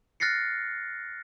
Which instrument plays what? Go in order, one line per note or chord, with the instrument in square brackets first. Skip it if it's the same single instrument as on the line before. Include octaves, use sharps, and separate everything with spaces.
[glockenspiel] F6 F#6 A6 A#6 C7 C#7